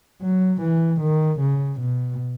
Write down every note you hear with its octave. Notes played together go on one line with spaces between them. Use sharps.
F#3
E3
D#3
C#3
B2